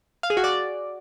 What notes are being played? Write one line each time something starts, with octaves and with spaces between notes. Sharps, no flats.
F5
G#4
F#4
D5